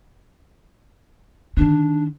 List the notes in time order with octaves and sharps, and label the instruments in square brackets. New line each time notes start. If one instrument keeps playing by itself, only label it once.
[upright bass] D3 D#3 [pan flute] D4